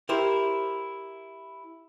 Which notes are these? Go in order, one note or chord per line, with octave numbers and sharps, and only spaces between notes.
E4 G4 A#4 C5